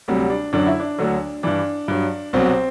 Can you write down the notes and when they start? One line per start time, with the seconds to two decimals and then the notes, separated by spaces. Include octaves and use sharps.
0.08 D2 C3 F#3 G3
0.30 D4
0.53 F#2 D3 F#3 D4
0.67 E4
0.80 D4
0.99 D2 D3 F#3
1.43 G2 E3 D4
1.88 G2 F#3
2.33 C2 B2 F#3 C4